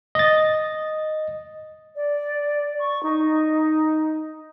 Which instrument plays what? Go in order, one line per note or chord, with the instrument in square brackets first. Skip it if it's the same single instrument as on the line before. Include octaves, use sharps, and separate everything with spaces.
[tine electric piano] D#5 A6
[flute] D5
C#6
D#4